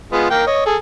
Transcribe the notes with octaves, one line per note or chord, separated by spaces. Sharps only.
G#3 B3 F4
A#3 A#4 G5
C#5 D#5
G#4 A4